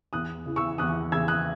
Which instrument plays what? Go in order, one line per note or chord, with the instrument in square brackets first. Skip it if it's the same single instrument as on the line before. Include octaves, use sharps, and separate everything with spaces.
[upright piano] E2 D#6 F#6
C#3 E3
C#6 E6
E2 D#6 F#6
C#3 E3 E6 G#6
D#6 F#6